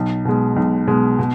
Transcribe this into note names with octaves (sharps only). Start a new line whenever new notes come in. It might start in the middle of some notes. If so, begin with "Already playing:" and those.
Already playing: B1
B2 G#3
B1
B2 G#3
B2